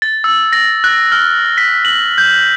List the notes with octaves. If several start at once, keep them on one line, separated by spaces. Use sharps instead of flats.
A6
E6
A#6
F#6
F6
B6
F#7
G6